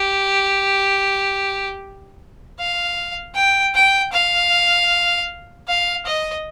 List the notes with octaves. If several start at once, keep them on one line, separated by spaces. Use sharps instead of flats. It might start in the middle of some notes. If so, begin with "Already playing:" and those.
Already playing: G4
F5
G5
G5
F5
F5
D#5